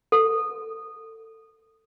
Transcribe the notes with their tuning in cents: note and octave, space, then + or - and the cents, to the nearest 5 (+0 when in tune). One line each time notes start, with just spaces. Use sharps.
A4 +20